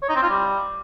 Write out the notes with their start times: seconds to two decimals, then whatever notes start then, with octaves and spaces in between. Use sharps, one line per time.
0.02 C#5
0.09 D#4
0.16 C4
0.22 F4
0.29 G3